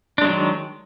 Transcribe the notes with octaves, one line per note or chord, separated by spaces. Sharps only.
D#3 F#3 G#3 D4